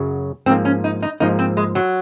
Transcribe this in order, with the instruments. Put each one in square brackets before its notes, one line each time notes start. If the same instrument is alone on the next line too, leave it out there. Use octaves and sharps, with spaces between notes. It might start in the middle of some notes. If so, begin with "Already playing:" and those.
Already playing: [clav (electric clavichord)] F#2 C#3 F#3
[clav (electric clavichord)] G#2 F3 A#3 [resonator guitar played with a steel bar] C4
[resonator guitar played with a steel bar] C#4
D#4
D#4
[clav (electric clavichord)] G#2 F3 A#3 [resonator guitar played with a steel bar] D#4
[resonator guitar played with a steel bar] C4
G#3
F#3